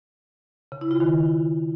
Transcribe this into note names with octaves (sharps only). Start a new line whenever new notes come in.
C#3
E4
F4
D#3